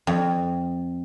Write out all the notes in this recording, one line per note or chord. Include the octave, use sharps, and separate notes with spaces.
F2